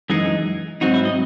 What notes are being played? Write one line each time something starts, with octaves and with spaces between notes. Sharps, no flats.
F#2 E3 G#3 D#4 G#4
G#2 F#3 C4 D#4 F#4
E4
D#5